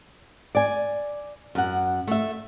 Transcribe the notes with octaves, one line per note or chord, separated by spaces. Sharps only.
D5 G#5
F#2 F#5
A3 E5